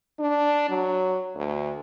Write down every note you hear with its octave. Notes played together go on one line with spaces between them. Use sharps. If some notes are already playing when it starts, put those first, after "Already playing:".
D4
F#3
D2